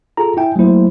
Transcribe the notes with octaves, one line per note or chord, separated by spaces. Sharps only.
F4 G#4 A4 A#5
E4 E5 G5 G#5
F#3 A3 A#3 E4 C5